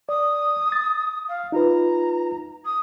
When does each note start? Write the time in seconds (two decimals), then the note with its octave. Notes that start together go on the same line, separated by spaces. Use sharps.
0.09 D5 D#6
0.72 A6
1.28 F5
1.52 D#4 F4 B4 A#5
2.65 D#6